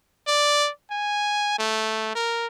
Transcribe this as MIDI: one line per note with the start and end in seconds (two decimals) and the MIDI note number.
0.27 0.69 74
0.91 1.56 80
1.59 2.12 57
2.15 2.47 70